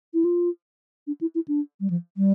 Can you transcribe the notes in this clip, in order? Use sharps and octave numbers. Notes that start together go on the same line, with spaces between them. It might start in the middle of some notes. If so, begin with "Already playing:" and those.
E4
F4
D4
E4
E4
D4
G3
F3
G3